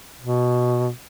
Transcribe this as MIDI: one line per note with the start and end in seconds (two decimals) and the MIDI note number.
0.21 0.90 47